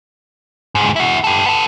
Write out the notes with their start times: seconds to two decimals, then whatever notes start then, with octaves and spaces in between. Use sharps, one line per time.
0.75 D2 G#2
0.96 E4 F#4
1.24 G4 A4
1.46 B3 A4